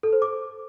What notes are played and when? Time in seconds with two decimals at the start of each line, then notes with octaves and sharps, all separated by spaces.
0.03 A4
0.13 C5
0.22 D6